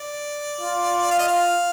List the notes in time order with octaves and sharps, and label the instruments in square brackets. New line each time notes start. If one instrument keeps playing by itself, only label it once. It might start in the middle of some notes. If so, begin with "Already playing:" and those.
Already playing: [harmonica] D5
[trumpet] F4
[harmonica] F5
D#5
F5